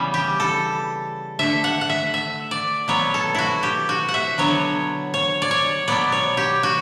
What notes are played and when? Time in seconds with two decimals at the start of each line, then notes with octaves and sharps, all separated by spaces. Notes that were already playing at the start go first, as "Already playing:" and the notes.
Already playing: C#3 E3 G3 B3
0.14 G4
0.40 A4
1.39 D3 A3 E5
1.64 F#5
1.81 F#5
1.89 E5
2.14 E5
2.51 D5
2.88 B2 F#3 B3 C#5
3.14 A4
3.35 E4 F#4
3.63 G4
3.89 F#4
4.09 F#5
4.14 E5
4.38 D3 F#3 B3 C#5
5.14 C#5
5.42 D5
5.51 C#5
5.88 B2 F#3 B3 D5
6.12 C#5
6.37 G4
6.63 F#4